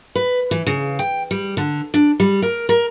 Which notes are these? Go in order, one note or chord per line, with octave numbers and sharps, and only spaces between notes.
B4
E3
C#3
G5
G3
D3
D4
G3
A#4
A#4